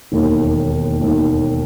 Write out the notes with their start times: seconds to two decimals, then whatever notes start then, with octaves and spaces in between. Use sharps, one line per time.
0.12 E1 D#2 D#3
1.01 E1 D#2 D#3